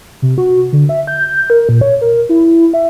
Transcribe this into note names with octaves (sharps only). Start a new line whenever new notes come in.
C3
F#4
D3
E5
G6
A#4
A#2
C#5
A#4
E4
E5